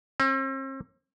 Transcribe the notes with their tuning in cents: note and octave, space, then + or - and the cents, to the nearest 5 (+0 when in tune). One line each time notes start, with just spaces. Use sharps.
C4 +45